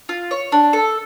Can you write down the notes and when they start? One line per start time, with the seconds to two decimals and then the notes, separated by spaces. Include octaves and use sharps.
0.09 F4
0.31 C#5
0.52 D4
0.73 A4